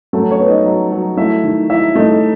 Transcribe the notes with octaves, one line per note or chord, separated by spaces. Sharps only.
F#3 A3 A4
C#4 C#5
B3
D#4 D#5
F#3
F#3
A3 E4 E5
D#3
D#4 E4 E5
A3 D#4 D#5